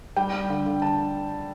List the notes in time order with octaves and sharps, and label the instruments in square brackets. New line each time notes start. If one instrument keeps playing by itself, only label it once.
[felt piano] G3 G5
G3
D3
D3
A5